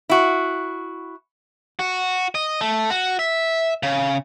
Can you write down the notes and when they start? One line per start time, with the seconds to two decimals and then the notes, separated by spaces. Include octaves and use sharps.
0.09 E4 F#4
1.79 F#4
2.35 D#5
2.61 A3
2.90 F#4
3.19 E5
3.83 C#3